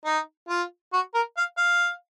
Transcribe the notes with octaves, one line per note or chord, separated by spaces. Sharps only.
D#4
F4
F#4
A#4
F5
F5